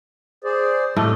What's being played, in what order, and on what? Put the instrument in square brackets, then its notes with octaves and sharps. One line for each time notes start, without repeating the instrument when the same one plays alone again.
[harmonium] G#4 C5 D5
[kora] A2 A3 D#5 [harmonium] C3 D5